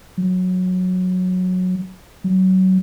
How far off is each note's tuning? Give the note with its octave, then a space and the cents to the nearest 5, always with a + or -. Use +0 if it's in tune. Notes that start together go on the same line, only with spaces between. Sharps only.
F#3 -15
F#3 +20